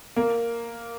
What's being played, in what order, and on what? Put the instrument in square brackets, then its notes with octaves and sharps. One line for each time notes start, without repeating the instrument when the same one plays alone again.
[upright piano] A#3